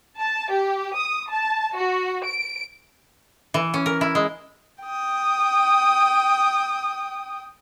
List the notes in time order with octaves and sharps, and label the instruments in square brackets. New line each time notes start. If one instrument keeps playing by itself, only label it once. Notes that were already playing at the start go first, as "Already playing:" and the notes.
[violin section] A5
G4
D#6
A5
F#4
D7
[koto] E3
C#4
A#4
E4
G#3
[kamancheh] G5 D#6